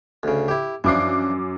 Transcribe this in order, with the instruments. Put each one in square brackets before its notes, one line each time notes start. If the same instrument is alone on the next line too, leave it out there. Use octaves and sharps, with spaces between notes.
[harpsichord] D2 C#3
E4 G4
[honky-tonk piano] F#2 D6 C7 [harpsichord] E3 F3 D4